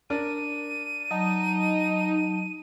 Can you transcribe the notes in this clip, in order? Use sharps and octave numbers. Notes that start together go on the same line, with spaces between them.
D4 A#4 D5 D#7
F#3 D#4 A5